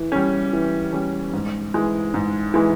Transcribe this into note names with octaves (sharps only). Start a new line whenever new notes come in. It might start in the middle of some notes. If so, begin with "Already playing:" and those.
Already playing: E3
G3 C#4
E3
G3 C#4
G#2
E3 G#3
G#2
E3 G#3